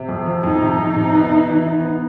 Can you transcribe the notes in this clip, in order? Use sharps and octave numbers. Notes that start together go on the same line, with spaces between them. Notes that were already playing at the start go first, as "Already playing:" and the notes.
Already playing: C3
F2
F3
F2 D#4
C3
F2
C3
B3
E4
E3
B3
B3